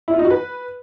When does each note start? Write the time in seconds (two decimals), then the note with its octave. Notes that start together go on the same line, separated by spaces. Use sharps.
0.08 E4
0.13 F4
0.19 D#4
0.25 F#4
0.30 B4